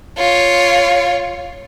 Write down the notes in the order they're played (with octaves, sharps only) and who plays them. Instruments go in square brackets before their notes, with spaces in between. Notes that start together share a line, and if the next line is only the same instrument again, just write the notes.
[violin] F4 C#5